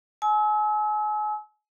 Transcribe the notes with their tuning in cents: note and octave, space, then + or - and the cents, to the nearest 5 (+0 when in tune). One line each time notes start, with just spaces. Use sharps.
G#5 +35 E6 -35